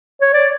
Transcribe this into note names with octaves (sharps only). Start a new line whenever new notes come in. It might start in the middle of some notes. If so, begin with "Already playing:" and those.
C#5
D5